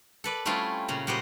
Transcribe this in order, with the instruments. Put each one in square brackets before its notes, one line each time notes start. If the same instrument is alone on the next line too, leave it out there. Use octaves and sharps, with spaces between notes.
[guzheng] A4 B4 D5
G3 A3 C4 C#4 E4 F4
A#2 C#3 A#5
A#2 G3 F#4 G4 C5 D#5